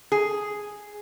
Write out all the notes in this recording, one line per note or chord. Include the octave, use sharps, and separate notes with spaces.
G#4